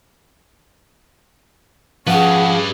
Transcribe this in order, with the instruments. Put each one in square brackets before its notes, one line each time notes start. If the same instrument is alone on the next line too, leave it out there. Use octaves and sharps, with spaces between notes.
[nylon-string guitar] F3 [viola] C#4 G#4 [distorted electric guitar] G4 B4 [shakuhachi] F#5